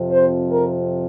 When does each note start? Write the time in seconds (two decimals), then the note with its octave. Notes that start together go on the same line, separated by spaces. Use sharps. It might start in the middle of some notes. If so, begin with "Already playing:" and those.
Already playing: F2 C3 F3
0.12 C5
0.52 A#4